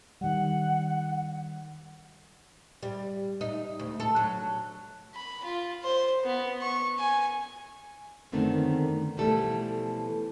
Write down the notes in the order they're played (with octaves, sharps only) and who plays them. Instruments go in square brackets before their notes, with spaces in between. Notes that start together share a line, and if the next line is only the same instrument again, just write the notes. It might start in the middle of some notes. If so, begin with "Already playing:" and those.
[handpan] D#3 G3 [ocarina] F#5
[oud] G3
D#4
D2
A4
F#3
[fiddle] B5
F4
C5
B3
C#6
G#5
[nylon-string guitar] F#2 D3 D#3 A3 B3 C4
B2 E3 F3 G3 A3 A4